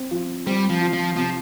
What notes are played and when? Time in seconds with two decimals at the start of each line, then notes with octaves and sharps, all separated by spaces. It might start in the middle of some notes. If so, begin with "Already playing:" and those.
Already playing: C4
0.11 F3
0.46 G3 C4
0.69 F3
0.81 F4
0.93 F3
1.16 C3 F3